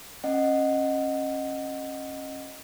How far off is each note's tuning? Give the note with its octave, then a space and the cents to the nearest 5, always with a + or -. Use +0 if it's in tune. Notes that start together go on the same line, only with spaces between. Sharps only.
C#4 -30 D#5 -5 F#5 -5